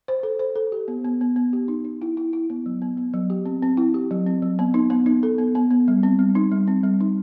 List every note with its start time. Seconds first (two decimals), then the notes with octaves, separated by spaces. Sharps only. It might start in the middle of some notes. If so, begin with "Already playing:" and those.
0.08 C5
0.23 A4
0.39 C5
0.56 A4
0.72 G4
0.88 B3
1.05 B3
1.21 B3
1.36 B3
1.53 G4
1.68 D#4
1.85 D#4
2.02 E4
2.17 E4
2.33 E4
2.50 B3
2.66 F#3
2.82 B3
2.97 B3
3.14 F#3
3.30 G4
3.46 C4
3.62 C4
3.77 E4
3.94 G4
4.11 F#3
4.27 C4
4.42 F#3
4.59 B3
4.74 D#4
4.90 B3
5.06 D#4
5.23 A4
5.38 B3
5.55 B3
5.71 B3
5.88 G3
6.03 C4
6.19 G3
6.35 D#4
6.52 G3
6.67 C4
6.83 G3
7.00 D#4